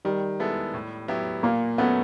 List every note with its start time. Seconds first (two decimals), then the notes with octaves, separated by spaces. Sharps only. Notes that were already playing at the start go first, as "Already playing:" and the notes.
0.05 D#3 G3
0.40 G#3 B3 E4 A4
0.74 A2
1.08 F#3 B3 E4 G4
1.43 A#2 A#3
1.78 F#3 A3 B3 C#4